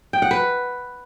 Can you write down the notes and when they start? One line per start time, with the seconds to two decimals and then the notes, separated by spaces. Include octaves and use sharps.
0.13 G5
0.22 F#5
0.31 B4